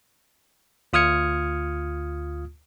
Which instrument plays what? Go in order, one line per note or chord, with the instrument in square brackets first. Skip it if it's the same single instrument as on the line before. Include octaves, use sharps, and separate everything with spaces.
[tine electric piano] D2 F4 D#6 F6 G#6 C#7